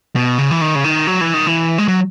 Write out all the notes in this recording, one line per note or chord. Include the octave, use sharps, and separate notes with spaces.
B2
C#3
E3
D#3
C#3
D#3
F#3
E3
D#3
E3
G#3
F#3